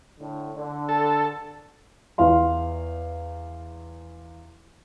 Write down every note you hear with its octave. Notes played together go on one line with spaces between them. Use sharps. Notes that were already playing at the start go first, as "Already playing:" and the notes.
A2 D3
D3
A4
E2 F5 C6